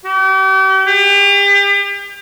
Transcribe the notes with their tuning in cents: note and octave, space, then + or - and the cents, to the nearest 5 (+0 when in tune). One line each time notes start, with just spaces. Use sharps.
G4 -40
G4 +35